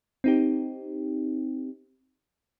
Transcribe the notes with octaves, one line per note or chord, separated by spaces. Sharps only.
C4 D#4 G4